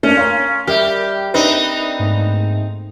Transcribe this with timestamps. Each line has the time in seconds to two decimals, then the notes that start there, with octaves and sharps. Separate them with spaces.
0.03 A3 A#3 C#4 D4
0.17 A#4 C#5 F5 C6
0.67 G3 G4 A#4 E5 G5 F6
1.34 C4 D4 D#4 B4
1.99 G#2 A3 A#3